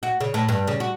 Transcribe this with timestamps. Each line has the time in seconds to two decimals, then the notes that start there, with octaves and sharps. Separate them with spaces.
0.03 F#4
0.21 C#3
0.34 A2
0.49 G2
0.67 C#3
0.80 F#4